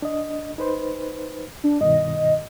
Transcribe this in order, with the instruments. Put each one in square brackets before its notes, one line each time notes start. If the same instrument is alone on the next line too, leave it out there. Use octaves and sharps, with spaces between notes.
[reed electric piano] D4 D#5
D#4 B4 C5
[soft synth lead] D4
[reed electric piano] G2 B2 D#3 [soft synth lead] D#5